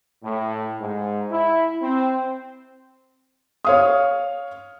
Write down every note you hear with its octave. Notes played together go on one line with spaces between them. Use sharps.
A2
G#2
E4
C4
C#5 F5 D#6